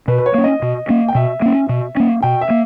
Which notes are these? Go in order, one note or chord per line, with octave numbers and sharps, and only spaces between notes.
B2 B4
B4
C#5
A#3 C#4
D#5
B2
A#3 C#4
G5
B2 E5
A#3 C#4
B2
A#3 C#4
B2 G5
E5
A#3